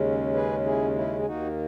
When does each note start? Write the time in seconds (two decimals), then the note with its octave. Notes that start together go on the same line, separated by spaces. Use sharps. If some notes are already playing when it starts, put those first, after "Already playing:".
Already playing: D#2 C#3 G#3 C#4
0.34 G#4 B4
0.65 E4 G#4
0.95 C#4 E4
1.20 G#4
1.26 D#2 D#3 A#3 D#4 F#4